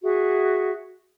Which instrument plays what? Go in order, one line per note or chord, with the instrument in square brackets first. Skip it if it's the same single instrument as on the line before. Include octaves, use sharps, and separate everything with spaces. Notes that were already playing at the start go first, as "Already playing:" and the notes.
[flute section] F#4 G#4 E5